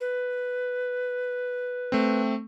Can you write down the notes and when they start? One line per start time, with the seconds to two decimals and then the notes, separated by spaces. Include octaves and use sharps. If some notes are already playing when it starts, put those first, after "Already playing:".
0.01 B4
1.92 A3 C4